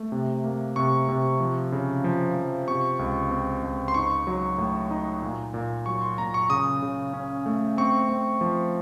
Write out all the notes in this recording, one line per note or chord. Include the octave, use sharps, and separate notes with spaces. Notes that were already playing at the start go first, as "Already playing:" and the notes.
Already playing: A3
C3
A#3
C3 C#6
C3
F3
C#3
F3
F3
C3 C#6
C#2
C4
C#2
C6
D#4 C#6
F#3
A2
D#4
A#2
A#2
F#3 C#6
C6
A#2 A#5
C#6
C#3 D#6
C#3
C#4
A3
C4 C#6
C4
F3